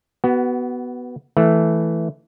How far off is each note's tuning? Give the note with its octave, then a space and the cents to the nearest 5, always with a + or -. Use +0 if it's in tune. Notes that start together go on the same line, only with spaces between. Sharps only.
B3 +0 F#4 +30
E3 +0 A3 +0